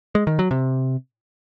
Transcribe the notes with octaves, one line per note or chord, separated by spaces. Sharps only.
G#3
D#3
F#3
C3